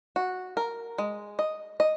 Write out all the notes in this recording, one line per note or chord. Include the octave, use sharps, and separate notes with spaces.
F#4
A#4
G#3
D#5
D#5